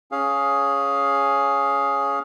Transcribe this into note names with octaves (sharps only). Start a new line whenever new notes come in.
C#4 G#4 F5